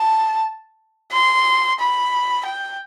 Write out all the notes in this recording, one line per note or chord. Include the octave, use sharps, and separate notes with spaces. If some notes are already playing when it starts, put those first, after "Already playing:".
Already playing: A5
C6
B5
G5